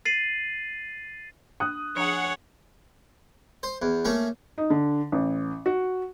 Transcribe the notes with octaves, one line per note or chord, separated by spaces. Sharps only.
A6 C7 D#7 F#7
D4 D#6 F#6
F3 D4 G#4 C#5 F#5 A#5
C5
E2
A3 A#3 C#4
D#4
D3
A1
F#4